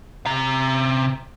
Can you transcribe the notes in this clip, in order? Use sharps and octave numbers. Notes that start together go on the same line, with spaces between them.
C3 A#5